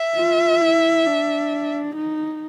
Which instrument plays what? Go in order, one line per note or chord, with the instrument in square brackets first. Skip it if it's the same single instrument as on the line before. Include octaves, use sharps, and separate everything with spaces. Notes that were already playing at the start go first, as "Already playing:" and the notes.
Already playing: [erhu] E5
[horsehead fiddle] F4
E4
D4
D#4